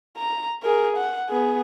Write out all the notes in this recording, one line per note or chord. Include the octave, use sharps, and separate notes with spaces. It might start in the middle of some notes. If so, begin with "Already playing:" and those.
A#5
G#4 A#4
F#5
B3 G#4